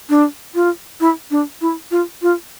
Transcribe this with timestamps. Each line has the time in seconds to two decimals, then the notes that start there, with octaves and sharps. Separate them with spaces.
0.10 D4
0.55 F4
1.00 E4
1.31 D4
1.61 E4
1.91 F4
2.22 F4